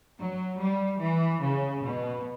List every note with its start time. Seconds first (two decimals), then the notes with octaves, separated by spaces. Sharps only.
0.19 F#3
0.60 G3
1.01 E3
1.42 C#3
1.83 B2